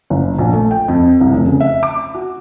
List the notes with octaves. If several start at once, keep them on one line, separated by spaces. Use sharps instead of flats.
F#1
A#1
A3
G5
F2
C2
F1
C#3
E5
D6
F#4